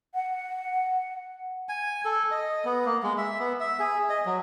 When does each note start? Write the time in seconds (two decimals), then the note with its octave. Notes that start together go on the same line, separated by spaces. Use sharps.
0.15 F#5
1.69 G#5
2.05 A4
2.31 D#5
2.65 B3
2.86 A#3
3.03 G#3
3.18 E5
3.40 B3
3.60 E5
3.79 G#4
4.10 D#5
4.26 F#3